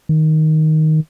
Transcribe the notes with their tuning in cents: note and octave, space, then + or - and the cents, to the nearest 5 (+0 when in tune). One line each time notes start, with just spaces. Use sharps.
D#3 +5